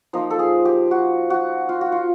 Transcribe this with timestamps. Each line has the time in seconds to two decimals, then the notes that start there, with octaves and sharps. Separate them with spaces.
0.13 F3 A#3 D#4 C5
0.30 A4
0.39 G#4
0.65 G4
0.91 F#4
1.30 F#4
1.69 F4
1.81 F#4
1.92 F4